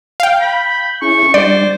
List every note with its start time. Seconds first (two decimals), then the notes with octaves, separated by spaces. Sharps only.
0.20 F5 G5
0.41 B5 G6
1.02 C#4 E4 G#4 C#6
1.34 G3 D4 C5 D5 A6